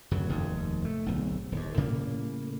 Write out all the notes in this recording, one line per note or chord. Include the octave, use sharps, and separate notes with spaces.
D1 F#2 C#3 F#3
F1 D#2 G#2
A3
D1 B1
D#1 D#2
A2 C#3 G3 A#3